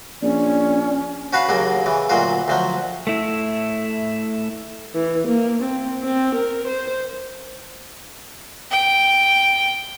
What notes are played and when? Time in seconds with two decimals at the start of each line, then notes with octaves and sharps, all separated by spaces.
0.22 A#1 C#4 D5
1.33 C#4 F#4 B4 F5
1.48 D#2 C#3 F#3 A#3
1.86 C#3 E3
2.10 D2 A#2 F#3 F4
2.48 D2 F3 F#3
3.07 A3 E4
4.95 E3
5.27 A#3
5.62 C4
6.03 C4
6.35 A#4
6.67 C5
8.71 G5